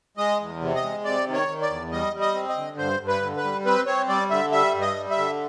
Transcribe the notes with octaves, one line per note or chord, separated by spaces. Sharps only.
G#3 D#5
E2
C3
D#5
G#3
C3 D5
D#3
C#5
D#3
D5
E2
G3 D#5
G3
D#5
C4
D#5
D3
G2 C5
G2
B4
D3
B4
G3
C4 B4
C4 C#5
G3 D5
D3 E5
G3 E5
G2
D#5
G3
E5
D3